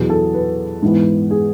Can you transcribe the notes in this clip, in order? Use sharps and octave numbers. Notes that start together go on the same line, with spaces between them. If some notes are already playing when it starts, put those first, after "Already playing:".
Already playing: E2 B2 F#3 B3 G#4
A4
B4
G#2 E3 B3
G#4